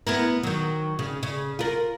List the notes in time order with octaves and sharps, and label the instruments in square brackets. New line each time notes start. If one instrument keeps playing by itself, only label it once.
[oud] B3 E4 A#4
D#3 F#3
C#3
C#3
F4 A#4